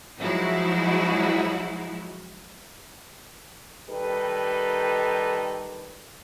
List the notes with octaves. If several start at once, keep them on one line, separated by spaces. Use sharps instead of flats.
F3 F#3 G#3 D#4 E4 F#4
D#3 G3 D#4 G4 A4 B4